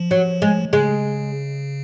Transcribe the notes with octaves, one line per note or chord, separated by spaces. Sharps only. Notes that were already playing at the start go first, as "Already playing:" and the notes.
Already playing: F3
F#3
G#3
C#3 G#3